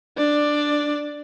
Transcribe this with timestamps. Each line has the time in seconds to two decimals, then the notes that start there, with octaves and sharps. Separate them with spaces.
0.18 D4 D5